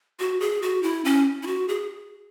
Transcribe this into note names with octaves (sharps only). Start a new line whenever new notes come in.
F#4
G#4
F#4
E4
C#4
E4
F#4
G#4